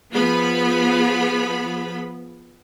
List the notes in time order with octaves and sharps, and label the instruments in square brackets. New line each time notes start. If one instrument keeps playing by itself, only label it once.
[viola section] F3 B3 G#4 B5